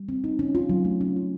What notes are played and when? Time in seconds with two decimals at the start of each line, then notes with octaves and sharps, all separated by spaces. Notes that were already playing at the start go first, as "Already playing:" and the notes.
Already playing: G3
0.09 C4
0.24 D#4
0.39 C#4
0.55 F4
0.69 F#3
0.85 A3
1.01 C#4
1.16 F4